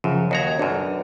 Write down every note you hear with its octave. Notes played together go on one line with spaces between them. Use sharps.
F#2 C#3 F3
D#2 F#4 D#5 A#5 G#6
B1 F#2 D4